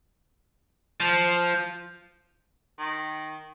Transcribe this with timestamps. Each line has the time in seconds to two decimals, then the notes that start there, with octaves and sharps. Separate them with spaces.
1.00 F3
2.79 D#3